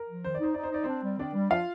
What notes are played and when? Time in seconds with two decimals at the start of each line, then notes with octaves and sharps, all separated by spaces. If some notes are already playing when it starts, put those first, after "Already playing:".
Already playing: A#4
0.09 F3
0.24 D#3 C5
0.34 D5
0.40 D#4 C5
0.54 D#4 D5
0.63 C5
0.71 D#4 D5
0.83 C4 D4 C5
1.03 G3
1.19 D#3 D4 D5
1.35 G3
1.50 F3 F4 F5